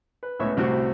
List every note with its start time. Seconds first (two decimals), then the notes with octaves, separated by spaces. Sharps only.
0.23 B4
0.39 C#2 A2 B3 C#5 E5 C#6
0.57 C2 A2 C3 C4 F#4